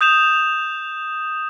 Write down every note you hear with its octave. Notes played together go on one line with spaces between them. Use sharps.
D#6 G6 E7 F7